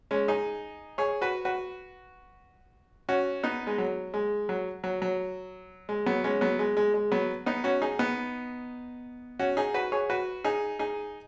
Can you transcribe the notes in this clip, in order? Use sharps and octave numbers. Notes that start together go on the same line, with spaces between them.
G#3 C#4
D#4 G#4
G#4 C#5
F#4 B4
F#4 B4
C#4 F#4
B3 D#4
G#3
F#3
G#3
F#3
F#3
F#3
G#3
F#3 B3
G#3 C#4
F#3 B3
G#3
G#3
G#3
F#3 B3
B3 D#4
C#4 F#4
D#4 G#4
B3 D#4
C#4 F#4
D#4 G#4
F#4 B4
G#4 C#5
F#4 B4
D#4 G#4
D#4 G#4